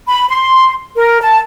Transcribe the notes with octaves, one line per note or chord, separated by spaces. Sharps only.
B5
C6
A#4
A5